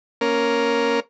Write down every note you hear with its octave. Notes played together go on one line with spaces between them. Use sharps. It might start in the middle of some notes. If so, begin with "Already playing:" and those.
A#3 C#4 A#4